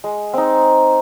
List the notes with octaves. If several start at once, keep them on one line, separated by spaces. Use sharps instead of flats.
G#3
C4 D#4